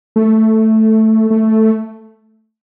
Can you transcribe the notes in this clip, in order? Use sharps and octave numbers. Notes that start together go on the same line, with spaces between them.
A3
A3